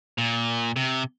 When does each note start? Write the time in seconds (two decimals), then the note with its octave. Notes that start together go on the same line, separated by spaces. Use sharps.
0.18 A#2
0.76 C3